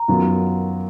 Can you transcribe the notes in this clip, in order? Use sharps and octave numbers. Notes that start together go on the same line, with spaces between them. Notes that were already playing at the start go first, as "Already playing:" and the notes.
Already playing: A#5
F#2 D#3 F#3 B3 F4